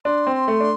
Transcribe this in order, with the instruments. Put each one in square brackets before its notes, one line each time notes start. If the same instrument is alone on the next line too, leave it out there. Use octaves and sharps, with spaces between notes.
[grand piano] D4 [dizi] C6
[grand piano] C4
A3
D4